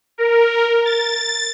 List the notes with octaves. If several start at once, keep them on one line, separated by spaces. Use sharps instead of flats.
A#4
A6